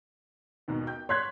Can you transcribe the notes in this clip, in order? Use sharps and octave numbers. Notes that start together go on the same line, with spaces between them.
D#2 G#2 B2
G5 G6
C#5 C6 F#6 G#6 B6